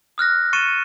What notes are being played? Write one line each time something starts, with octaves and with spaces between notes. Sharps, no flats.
D#6 F6 F#6 A#6
C#6 A6 C#7 D#7 E7